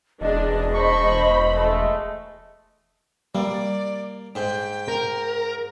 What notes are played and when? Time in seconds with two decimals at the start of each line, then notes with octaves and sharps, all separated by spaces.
0.21 E1 D4 G#4 D#5
0.73 C5 A5 B5 C#6
1.55 G#3 A3
3.35 G3 A#3 D5
4.35 G#2 G5
4.88 A#4